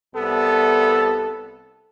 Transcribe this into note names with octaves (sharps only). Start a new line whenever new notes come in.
C2 B3 A4